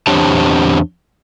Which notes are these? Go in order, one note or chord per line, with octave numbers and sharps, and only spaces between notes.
E2 C4 D4 G4 C#5 A5